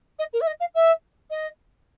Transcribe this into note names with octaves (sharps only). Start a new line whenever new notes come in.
D#5
A#4
E5
D#5
F5
E5
D#5